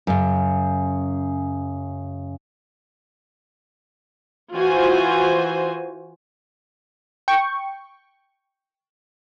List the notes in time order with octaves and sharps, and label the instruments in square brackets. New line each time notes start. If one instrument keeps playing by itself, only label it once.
[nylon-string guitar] F#2 C#3
[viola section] E3 F4 F#4 C5 G#5
[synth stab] G5 C#6